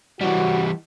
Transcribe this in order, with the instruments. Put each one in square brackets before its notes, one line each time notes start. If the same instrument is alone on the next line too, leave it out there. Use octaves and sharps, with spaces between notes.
[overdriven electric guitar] E3 G3 [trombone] F#4